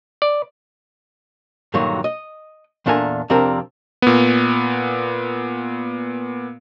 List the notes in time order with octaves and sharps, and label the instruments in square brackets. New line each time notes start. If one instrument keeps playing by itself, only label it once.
[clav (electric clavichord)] D5
[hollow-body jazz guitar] G2 A#2 D3 D#3 F#3
D#5
E2 A#2 D4 A4 A#4 G#5
F2 C3 C4 D4 A#4
[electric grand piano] A#2 B3